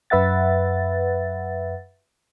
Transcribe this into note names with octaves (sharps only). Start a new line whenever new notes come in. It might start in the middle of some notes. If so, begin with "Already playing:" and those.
F#2 B4 E5 F#5 A6